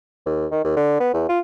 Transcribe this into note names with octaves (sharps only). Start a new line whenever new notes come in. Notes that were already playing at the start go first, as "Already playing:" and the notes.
D#2
D#3
D#2
D3
B3
E2
F4